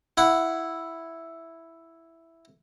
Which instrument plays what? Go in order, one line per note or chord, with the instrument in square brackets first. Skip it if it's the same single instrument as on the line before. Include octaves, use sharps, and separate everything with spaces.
[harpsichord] E4 F#5